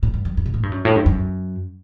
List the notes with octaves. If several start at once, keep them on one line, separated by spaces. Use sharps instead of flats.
A2
G2
F#2
G2
B2
A2
G2
F#2
A2
G2
F#2